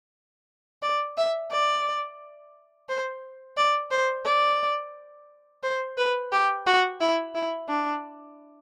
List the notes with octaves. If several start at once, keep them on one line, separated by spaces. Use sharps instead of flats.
D5
E5
D5
C5
D5
C5
D5
C5
B4
G4
F#4
E4
E4
D4